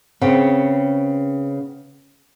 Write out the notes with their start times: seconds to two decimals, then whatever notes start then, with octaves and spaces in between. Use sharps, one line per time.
0.21 C#3 B3 C4